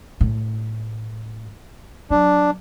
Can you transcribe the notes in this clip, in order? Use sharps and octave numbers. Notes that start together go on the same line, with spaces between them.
A2
F#3 D4